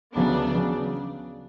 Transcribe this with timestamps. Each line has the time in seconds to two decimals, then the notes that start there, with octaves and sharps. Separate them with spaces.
0.15 D2 C#3 F#3 B3 D4
0.55 C#3 F#3